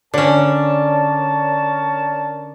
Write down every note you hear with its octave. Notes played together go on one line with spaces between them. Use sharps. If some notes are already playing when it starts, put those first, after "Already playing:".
D3 C#4 A#4 C#5 D5 A5